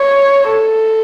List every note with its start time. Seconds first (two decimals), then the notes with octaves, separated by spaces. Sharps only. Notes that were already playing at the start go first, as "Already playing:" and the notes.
Already playing: C#5
0.48 A4